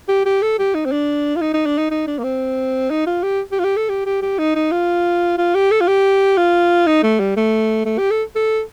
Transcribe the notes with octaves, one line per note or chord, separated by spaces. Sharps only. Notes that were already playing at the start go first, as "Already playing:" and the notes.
G4
G4
A4
G4
D#4
C4
D4
F4
D#4
D#4
D4
D#4
D#4
D4
A#3
C4
D#4
F4
G4
G4
F4
G4
A4
G4
G4
G4
D#4
D#4
F4
F4
G4
A4
F4
G4
F4
D#4
A3
G3
A3
A3
G4
A4
A4